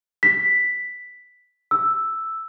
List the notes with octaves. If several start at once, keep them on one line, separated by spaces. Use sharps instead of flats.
B6
E6